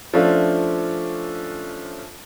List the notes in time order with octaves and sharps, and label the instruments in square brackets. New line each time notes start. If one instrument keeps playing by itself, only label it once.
[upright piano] F3 A3 C#4 D4 F4 A4